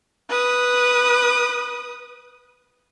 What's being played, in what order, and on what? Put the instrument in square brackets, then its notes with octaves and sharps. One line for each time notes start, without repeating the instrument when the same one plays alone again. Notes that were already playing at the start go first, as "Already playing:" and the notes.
[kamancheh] B4 D#6